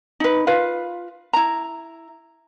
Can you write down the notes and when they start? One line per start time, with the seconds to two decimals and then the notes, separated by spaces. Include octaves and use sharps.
0.20 D#4 B4
0.47 F4 B4 F5
1.33 E4 A#5